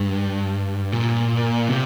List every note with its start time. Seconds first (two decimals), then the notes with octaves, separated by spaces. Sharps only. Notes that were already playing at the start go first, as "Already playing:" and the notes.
Already playing: G2
0.92 A#2
1.69 C3